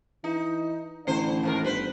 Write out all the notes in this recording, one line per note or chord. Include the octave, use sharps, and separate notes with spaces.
E3 D#4
A1 D3 C5
D#2 G#2 A#4
G1 B4 C5